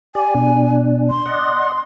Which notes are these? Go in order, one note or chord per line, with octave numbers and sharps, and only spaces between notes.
G4 D5 G#5
B2 D4
C6
D5 D#5 F#5